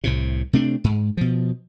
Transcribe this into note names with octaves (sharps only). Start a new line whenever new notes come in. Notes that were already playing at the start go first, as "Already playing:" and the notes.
C2 A2 C3
C3 A3 C4 D4
G#2
B2 F3